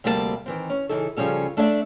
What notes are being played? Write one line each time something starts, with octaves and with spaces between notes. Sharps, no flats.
D2 C3 G3 A#3 A#4 A5
D#3 E3 C4
C#4
C#3 E3 D#4 E4 A4
C#3 F3 G3 C#4 A4
A3 D4 A4 D5 E5